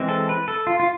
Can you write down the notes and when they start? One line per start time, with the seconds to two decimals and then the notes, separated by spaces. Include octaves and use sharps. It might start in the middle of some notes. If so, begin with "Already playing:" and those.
Already playing: E3 G#3 C4
0.09 A4
0.29 B4
0.48 A4
0.67 F4
0.80 F4